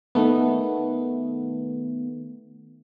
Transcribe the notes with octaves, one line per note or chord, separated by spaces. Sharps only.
D#3 A3 B3